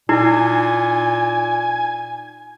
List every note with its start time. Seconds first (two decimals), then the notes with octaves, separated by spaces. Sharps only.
0.09 A#2 D#4 E4 G#5